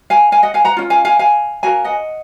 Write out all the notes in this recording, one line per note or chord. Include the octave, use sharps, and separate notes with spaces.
F5 G#5
F5 G#5
D#5 F#5
F5 G#5
F#5 A#5
C#4 F4
F5 G#5
F5 G#5
F5 G#5
C#4 F#4 A#4 F5 G#5
D#5 F#5